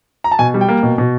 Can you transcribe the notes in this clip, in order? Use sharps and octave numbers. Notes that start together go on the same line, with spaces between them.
A#5
A5
B2 G#5
G3
G5
A#3
B2
B2